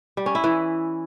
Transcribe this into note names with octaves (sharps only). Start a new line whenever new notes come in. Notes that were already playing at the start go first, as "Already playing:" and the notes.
G3
C#4
E4
E3